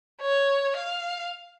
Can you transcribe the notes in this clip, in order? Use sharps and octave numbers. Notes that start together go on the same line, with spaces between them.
C#5
F5